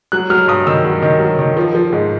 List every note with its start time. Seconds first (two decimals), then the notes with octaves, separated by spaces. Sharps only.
0.12 F#3 F#6
0.30 F#3 F6
0.48 G2 D#6
0.67 D#3 E6
0.85 F#3
1.02 D#3
1.20 F#3
1.39 D#3
1.57 F3
1.75 F3
1.93 G#2